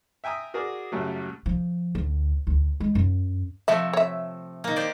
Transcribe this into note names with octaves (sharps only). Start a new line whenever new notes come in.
E5 G5 G#5 A#5 D#6
F#4 G#4 A#4 D5 D6
F#2 A2 C#3 F#3 G3 A3
F3
D2
D2
G#3
F#2
C3 F3 A3 E5
C#5 E5
D#3 A#3
G4 C5 D5